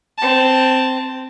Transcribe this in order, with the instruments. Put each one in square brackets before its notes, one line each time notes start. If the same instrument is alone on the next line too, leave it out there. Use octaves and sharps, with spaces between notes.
[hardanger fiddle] C4 A5